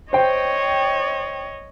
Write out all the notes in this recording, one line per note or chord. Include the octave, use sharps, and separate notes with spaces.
C5 C#5 D#5 G5